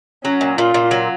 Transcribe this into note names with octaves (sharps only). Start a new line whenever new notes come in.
F#3 C#4
A#2
A#2 F4
A#2
F#3